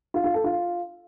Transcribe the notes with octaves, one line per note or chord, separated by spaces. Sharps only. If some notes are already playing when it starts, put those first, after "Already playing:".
F4
F4
A4
F4